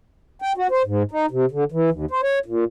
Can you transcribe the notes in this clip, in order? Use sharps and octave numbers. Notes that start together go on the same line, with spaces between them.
G5
F#4
C5
G#2
D#4
C3
D3
E3
D#2
C5
C#5
A#2